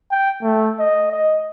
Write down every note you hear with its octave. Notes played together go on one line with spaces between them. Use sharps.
G5
A3
D#5
D#5